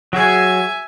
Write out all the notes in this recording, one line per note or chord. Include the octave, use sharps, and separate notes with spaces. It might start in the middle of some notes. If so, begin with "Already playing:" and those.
F#3 F#4 G#4 E5 G#5